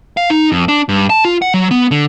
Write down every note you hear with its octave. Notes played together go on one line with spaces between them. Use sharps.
F5
D#4
F2
D4
G2
A5
F4
F#5
F#3
B3
D3